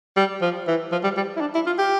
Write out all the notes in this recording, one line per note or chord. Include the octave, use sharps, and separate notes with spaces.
G3
F3
E3
F3
G3
G3
E4
D4
E4
F4
G4